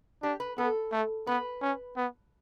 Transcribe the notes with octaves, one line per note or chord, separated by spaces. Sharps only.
D4 G4
B4
B3 A4
A3
B3 B4
C#4
B3